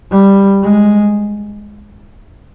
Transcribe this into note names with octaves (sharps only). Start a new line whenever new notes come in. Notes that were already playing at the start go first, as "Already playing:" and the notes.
G3
G#3